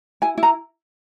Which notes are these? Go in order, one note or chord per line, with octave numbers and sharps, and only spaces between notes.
E4 G#5
E4
A#5